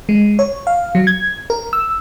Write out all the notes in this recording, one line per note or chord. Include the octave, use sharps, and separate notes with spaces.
G#3
C#5
F5
F#3
G#6
A#4
E6